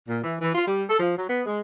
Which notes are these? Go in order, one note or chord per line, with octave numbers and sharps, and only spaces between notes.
A#2
E3
E3
F4
G3
A4
F3
F#3
B3
G#3